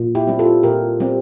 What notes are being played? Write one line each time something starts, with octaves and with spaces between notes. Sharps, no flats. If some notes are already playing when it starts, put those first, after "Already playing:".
Already playing: A#2
E4 G4
G3 C4
F4 A4
A#2 G4 A#4
G3 C4